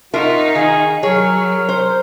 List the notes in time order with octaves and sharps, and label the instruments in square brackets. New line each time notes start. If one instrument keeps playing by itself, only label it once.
[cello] D#4 F5 [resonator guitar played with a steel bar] F4 A#4 E5 [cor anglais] F#4
[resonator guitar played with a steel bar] D#3 [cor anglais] G#4
[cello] F#3 [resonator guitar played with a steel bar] G#4 C#5 [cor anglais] A#4
[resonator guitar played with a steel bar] C5